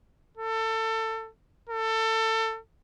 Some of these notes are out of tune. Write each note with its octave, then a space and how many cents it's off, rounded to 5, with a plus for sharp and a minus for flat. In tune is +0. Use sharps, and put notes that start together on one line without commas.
A4 +25
A4 +25